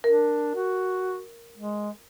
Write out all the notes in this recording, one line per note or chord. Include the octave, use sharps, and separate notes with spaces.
D4 A#4
F#4
G#3